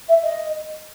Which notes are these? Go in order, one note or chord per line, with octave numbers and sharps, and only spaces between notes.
E5
D#5